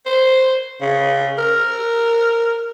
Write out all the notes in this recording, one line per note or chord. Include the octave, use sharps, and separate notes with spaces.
C5
C#3
A#4